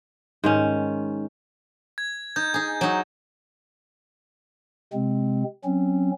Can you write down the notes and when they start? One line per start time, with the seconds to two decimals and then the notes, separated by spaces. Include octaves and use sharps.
0.44 G#2 D#3 C#4
1.98 G#6
2.36 D#4 G6
2.54 D#4 G#4
2.81 F#3 D#4
4.93 C3 G#3 C4
5.65 F#3 C4 C#4